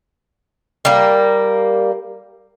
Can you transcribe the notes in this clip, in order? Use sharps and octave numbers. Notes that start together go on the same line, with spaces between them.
G3 A#3